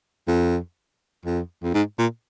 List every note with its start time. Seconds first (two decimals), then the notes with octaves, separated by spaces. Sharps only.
0.28 F2
1.25 F2
1.63 F2
1.74 G#2
1.99 A#2